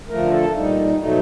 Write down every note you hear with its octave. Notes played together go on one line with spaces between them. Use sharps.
D3 F3 A3 A#4
A4
A#2 G3 D#4
B2 F#3 A3 D#4